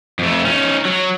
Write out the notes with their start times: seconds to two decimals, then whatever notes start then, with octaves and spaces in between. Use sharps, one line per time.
0.19 F2 A3
0.45 C#4 D#4
0.85 F#3